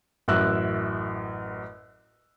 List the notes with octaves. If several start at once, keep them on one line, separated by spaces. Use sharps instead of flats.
A1 F#2 A#4 E5 E6 F#6